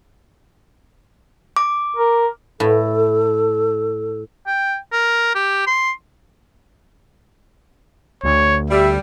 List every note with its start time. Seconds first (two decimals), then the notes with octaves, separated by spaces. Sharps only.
1.57 D6
1.96 A#4
2.60 A2 A4
4.47 G5
4.92 A#4
5.35 G4
5.67 C6
8.24 D2 C#5
8.70 G3 E5